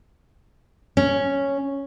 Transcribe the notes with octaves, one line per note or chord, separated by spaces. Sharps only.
C#4